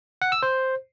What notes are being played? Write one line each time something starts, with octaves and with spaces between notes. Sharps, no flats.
F#5
E6
C5